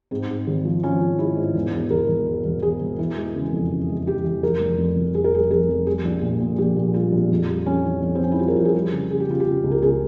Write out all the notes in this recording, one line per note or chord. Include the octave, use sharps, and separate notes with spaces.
G#2 C4
G#2
G#1
F3
F3 C#4
F3
G#3 E4
G#2
E1
E2
E1 A#4
E1
E2
E1
E2 G#4
E1
E3
G#3
C#3
F2
C#3
G#3
E3 G4
E3
F1 A#4
F1
F2
F1
F1 G#4
A#4
G3 G#4
F2 A#4
F2
G3 G#4
A#1
A#2
A#2
A#1 G4
A#2
G3 F4
A#1
F2
G3
F2 C#4
E3
F2
C4
F2 C#4
E4
G3 F4
A#4
F2 G4
G#4
G3
C#3
C#3 G#4
G4
C#3 F4
G4
C#3
C#2
A#4
C#2 G#4